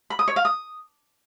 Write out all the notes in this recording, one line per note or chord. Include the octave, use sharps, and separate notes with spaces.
B5
D#6
C#5
F5
D#6